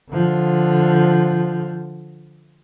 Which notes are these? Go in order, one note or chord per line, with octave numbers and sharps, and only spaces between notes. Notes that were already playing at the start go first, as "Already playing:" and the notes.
D3 F3